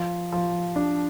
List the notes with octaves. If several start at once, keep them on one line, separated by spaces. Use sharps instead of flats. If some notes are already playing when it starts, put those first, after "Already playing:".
Already playing: F3
F3
D4